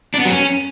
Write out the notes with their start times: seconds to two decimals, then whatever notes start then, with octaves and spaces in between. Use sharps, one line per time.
0.14 D4
0.19 B3
0.25 F#3
0.31 C#4